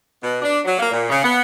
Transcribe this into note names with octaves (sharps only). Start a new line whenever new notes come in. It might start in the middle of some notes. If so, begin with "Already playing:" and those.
B2
D4
F#3
A#3
A#2
C#3
B3